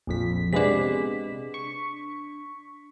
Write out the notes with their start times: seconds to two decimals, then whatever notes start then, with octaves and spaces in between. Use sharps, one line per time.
0.07 A#1 F2 B6
0.53 C3 G#3 B3 D4 B6
1.54 C#6